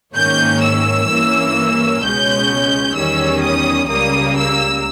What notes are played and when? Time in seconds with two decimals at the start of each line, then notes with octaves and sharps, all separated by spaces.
0.15 G#2 D#3 A#3 C#4 G6
0.62 E6
1.09 G2 E3 A#3 C#4
2.02 C#2 B2 G#3 C#4 G6
2.95 E2 D#3 G3 C#4 E6
3.42 D#6
3.89 C#2 C#3 G3 A#3 D#6
4.36 E6